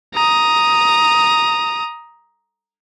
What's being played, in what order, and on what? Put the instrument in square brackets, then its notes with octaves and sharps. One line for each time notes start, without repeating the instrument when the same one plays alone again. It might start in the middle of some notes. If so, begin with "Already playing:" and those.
[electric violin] A#5 D#6